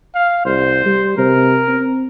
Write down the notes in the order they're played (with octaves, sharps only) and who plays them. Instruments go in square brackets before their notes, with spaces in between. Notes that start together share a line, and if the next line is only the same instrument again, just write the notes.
[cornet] F5
[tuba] C2 [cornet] C5
[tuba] G3
[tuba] C3 [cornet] A#4
[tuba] C4